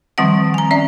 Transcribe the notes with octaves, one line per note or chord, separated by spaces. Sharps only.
D#3 F3 G3 C4 F#5
G#5 A#5
C#4 D5 E5